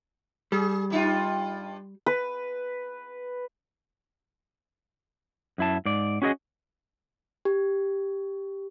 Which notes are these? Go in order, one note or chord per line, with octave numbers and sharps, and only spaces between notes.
G3 G#4
G2 D#4 F4
B4
F#2 E4 A5
G#2 D5
C#4 F#4 G#4 A#4 D#5
G4